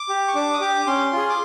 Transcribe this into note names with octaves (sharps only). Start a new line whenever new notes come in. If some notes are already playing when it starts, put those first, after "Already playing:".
Already playing: D6
G4
C#6
D4 D6
D#6
G4 D6
C#4 C6
F4 G#4
D6